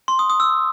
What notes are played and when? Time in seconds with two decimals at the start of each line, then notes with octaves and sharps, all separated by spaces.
0.08 C6
0.19 D#6
0.30 D#6
0.40 E6